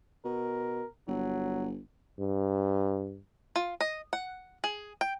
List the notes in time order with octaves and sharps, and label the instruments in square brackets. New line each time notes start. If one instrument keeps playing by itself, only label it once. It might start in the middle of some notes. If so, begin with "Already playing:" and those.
[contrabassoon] B2 [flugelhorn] A#4
[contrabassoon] G1 [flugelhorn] F#3
[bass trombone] G2
[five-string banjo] F4
D#5
F#5
G#4
G5